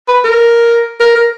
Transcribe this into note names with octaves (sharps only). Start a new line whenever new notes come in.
B4
A#4
A#4
A#4